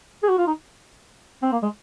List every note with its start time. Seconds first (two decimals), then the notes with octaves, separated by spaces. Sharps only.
0.23 G#4
0.29 F#4
0.38 F4
0.47 D#4
1.43 C4
1.52 A#3
1.62 G#3